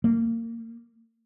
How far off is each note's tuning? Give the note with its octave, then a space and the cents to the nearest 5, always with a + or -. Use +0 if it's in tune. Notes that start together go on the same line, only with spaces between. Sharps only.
A#3 -25